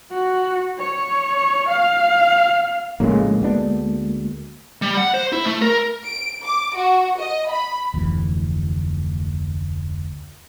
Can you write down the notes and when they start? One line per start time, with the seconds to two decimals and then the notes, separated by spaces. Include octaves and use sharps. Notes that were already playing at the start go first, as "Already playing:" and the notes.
0.11 F#4
0.78 C#5
1.68 F5
3.00 A#1 A2 C#3 G#3 A#3
3.42 D2 B3 D4
4.82 G3
4.97 F#5
5.14 C5
5.32 E4
5.46 A3
5.62 A#4
6.05 D7
6.44 D6
6.76 F#4
7.18 D#5
7.50 B5
7.94 F1 D2 E3